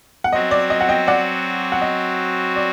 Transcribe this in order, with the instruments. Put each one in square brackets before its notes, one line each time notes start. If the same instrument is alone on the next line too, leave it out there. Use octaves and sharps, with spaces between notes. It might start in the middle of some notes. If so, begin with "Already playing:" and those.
[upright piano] F#5
[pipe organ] F#3 C4 F#4 [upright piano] D#5
[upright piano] D5
D#5
F#5
D#5 G5
D5 F#5
F#5
D#5
D5